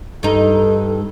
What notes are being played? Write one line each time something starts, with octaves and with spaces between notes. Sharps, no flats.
G2 D#4 A4